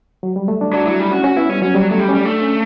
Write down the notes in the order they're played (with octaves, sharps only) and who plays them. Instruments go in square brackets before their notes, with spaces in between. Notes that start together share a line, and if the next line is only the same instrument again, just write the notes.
[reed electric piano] F#3
G3
A3
D4
[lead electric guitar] F#3 [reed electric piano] D4
[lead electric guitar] F#3 [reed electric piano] E4
[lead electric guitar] G3
[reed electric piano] C#4 [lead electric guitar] F#4
[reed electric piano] C#4 [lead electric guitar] F#4
[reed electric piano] B3 [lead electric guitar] E4
[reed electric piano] G3 [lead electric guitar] C#4
[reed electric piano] F#3 [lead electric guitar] C#4
[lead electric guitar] F#3 [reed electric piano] G3
[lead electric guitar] F#3 [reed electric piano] A3
[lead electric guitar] G3
[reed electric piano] C#4
[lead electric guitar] G3
[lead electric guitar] A3 [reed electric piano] D4
[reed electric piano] C#4